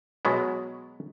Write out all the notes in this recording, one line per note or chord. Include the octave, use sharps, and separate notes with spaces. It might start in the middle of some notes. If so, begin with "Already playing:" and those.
B2 F#3 G#3 B3